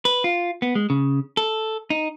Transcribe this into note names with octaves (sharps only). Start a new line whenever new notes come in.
B4
F4
B3
G#3
C#3
A4
D#4